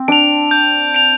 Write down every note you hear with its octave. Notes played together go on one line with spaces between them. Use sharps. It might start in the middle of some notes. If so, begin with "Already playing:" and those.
Already playing: C4
D4 D7 F7
G6
D7 F7